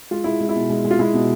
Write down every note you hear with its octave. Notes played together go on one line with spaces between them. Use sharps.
G#3 F4
G#3 E4
G#3
E4
B2
G#3
G#3
F4
G#3 E4
B2